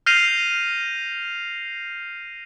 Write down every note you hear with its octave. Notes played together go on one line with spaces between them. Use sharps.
F6 G6 A#6 C7 D#7 F7